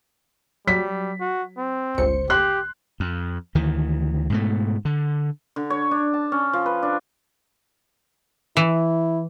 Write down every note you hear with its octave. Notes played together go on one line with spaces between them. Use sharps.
F#3 G3 B6
F#4
C4
G1 C#2 C5 C#7
G4 C6 F#6
F2
D2 D#3 E3
G#2 B2 A3
D3
D3
C#5
D4
A5
C#4
F3
B4
D4
E3 E4